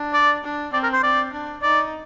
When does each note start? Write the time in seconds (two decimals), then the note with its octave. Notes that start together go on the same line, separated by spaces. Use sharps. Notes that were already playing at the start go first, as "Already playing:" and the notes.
Already playing: D4
0.13 D5
0.44 D4
0.73 C4 D5
0.83 A#4
0.94 C5
1.03 C4 D5
1.33 D4
1.63 D#4 D5